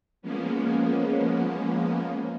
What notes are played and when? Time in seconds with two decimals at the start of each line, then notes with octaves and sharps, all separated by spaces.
0.22 F3 G#3 A#3 B3 C#4